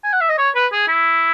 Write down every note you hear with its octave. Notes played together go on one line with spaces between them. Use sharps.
G#5
F#5
E5
D#5
C#5
B4
G#4
E4